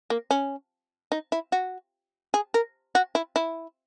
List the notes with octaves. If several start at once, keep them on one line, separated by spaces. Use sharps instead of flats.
A#3
C#4
D#4
E4
F#4
G#4
A#4
F#4
E4
E4